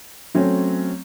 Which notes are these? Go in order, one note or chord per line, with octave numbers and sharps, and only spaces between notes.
F#3 A3 C4 C#4